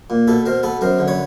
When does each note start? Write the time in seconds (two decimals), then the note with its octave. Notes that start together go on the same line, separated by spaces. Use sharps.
0.10 A#2
0.28 B2 A4 B4
0.45 B2 A#4 C5
0.63 B3 A4 B4
0.81 F#2 A#4 C5
0.99 D3
1.08 B4 C#5